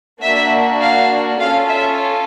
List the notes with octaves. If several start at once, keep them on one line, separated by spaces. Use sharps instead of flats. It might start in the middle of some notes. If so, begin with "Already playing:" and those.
A#3 D4 F#4 E5
F5
C#4 F4 A4 F5
E5